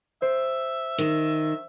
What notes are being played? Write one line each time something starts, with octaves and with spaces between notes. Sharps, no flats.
C5 E5
D#3